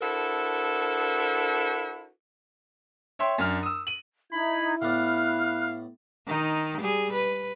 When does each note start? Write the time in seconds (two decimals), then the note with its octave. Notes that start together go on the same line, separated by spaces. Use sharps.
0.01 D4 E4 F#4 A4 A#4 C5
3.19 C#5 E5 G5 C6
3.38 F#2 D4 F6
3.63 D#6 E6
3.87 D#7 F#7
4.33 D#4 E4 E5 B5 G#6
4.82 A2 B3 D5 F5 B5 F6 F#6
6.27 D#3 D#4
6.80 G3 G#4
7.13 B4